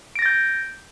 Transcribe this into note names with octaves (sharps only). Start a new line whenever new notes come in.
G6 A6 A#6 D7